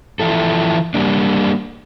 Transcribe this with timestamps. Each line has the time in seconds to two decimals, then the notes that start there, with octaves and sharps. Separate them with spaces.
0.20 E3 F3 E4 A4
0.94 G3 A#3 D4